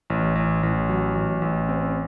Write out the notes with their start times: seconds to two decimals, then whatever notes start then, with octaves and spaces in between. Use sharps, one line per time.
0.10 A1
0.35 A1
0.63 A1
0.89 F#3
1.15 A1
1.42 A1
1.69 C4